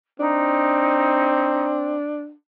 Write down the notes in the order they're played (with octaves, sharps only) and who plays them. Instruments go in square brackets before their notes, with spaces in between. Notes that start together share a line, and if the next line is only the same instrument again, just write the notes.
[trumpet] C4 [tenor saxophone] D4 [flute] D#4